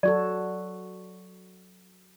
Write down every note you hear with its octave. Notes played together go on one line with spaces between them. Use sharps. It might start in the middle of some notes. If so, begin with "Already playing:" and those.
F#3 F#4 A4 D5